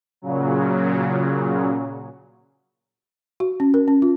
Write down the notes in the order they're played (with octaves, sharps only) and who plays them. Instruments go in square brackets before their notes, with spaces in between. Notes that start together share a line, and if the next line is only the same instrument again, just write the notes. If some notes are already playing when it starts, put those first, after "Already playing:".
[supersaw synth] A#2 C#3 F#3
[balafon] F#4
C#4
A#4
C#4
F4